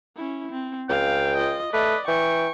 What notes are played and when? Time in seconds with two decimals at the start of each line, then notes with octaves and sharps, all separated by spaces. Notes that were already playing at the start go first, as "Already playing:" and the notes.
0.16 C#4 E4
0.51 C4
0.90 C#2 F5 G5
1.37 F4 D#5
1.73 A3 B4 D5 D#5
2.08 E3 G5 C#6